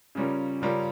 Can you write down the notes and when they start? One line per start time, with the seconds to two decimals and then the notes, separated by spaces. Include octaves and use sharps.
0.15 C#3 G3 C#4 F4 A#4
0.62 C#3 G3 C#4 F4 A#4